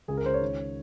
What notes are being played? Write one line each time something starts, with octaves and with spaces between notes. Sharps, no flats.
C#2 G#4
A#4
C#2 C5
C#5
D#3